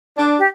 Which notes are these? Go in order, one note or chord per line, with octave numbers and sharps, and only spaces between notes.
D4
G4